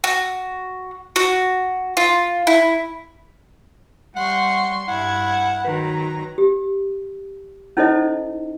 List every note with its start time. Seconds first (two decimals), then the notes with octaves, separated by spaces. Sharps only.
0.04 F#4
1.16 F#4
1.97 F4
2.47 E4
4.16 G3 F#5 C6 C#6
4.88 G2 E4 F#5 G#6
5.64 D#3 F#3 B4 A#5
6.38 G4
7.77 C#4 D#4 E4 A4 C5 D#5